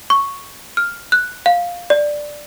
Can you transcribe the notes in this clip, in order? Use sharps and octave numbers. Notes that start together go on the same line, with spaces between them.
C#6
F6
F#6
F5
D5